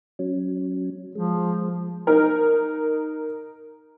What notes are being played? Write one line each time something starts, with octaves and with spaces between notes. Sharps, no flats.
F#3 C#4
F3 G#3
D#4 A#4